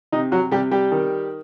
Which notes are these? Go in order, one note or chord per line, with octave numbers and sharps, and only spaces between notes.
C3 D#4
F#3 F#4
C3 G3 G4
G3 G4
D#3